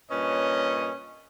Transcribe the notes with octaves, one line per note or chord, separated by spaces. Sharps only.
G2 A#2 C#4 B4 C#5 D#5